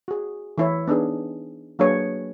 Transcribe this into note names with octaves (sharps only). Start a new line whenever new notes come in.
F#4 G#4
E3 E4 C#5
B3 D4 D#4 G#4
F#3 A#3 D4 G#4 B4 C#5